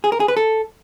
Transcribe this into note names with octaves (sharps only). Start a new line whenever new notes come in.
G#4
A#4
G#4
B4
A4